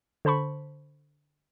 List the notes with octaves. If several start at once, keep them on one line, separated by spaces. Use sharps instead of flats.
D3 C5 A5 B5 C#6